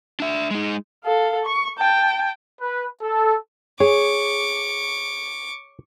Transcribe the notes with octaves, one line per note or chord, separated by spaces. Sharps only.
D4 E5
G#3 D#4
A4 F5
C#6
G5 A5
B4
A4
G#4 C#5 C#6 D6